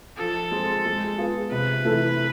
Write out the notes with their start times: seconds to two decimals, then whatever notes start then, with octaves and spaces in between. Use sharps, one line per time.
0.18 F3 A4
0.51 G#3 C4 G#4
0.85 G#3
1.18 B3 F4 G#4
1.52 C3 B4
1.84 E3 A3 E4 A4